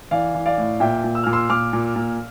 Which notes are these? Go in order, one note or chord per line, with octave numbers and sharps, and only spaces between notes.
E3 D5 F5
E3
D5 F5
A2
A#2 E5 G5
A#2
E6
A#2 F6
C6 E6
A#2 D6 F6
A#2
A#2